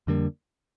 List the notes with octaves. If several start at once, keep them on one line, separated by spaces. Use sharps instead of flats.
F2 D3 G3 A#3